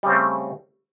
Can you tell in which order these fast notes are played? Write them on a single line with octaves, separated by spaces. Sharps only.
G3 C#3 C4 A3